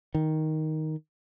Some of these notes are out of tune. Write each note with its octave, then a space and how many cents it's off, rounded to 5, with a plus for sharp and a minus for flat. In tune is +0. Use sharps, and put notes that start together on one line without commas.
D#3 +5